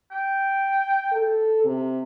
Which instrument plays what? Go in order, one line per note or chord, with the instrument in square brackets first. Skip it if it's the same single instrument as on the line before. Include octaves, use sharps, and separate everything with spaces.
[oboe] G5
[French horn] A4
C3